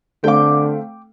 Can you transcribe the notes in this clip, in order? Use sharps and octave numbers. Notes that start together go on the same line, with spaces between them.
D3 A3 C4 F5 G5 D6